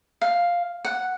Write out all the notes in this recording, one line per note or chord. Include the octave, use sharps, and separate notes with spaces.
F5
F#5